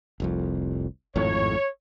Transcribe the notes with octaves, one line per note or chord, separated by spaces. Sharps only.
F1 C2 F2
G#1 F2 A2 C#5